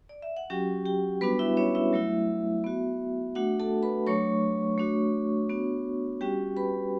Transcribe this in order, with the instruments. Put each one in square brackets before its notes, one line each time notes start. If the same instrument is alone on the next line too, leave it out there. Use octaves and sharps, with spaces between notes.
[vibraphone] D5
E5
F#5
F#3 C#4 F#4 G4 G5
G4 G5
G3 B3 D4 F#4 B4 B5
E4 E5
C#4 C#5
E4 E5
F#3 A3 E4
B3 F#4
A3 D4 F#4 F#5
A4 A5
B4 B5
F#3 A3 D4 C#5 C#6
A3 D4 F#4
B3 D4 F#4
G3 C#4 F#4 G4 G5
B4 B5